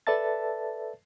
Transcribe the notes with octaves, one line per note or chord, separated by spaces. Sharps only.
A4 B4 D5 E5 A5 A6